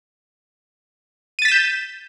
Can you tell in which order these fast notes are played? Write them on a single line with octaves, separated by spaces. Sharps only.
D#7 A6 B6 E7 G6